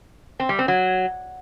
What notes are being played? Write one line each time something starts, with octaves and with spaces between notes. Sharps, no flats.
C4
G3
C4
F#3